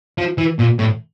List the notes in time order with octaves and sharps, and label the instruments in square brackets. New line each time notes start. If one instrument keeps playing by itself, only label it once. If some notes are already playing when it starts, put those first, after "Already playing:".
[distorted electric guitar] F3
E3
A#2
A2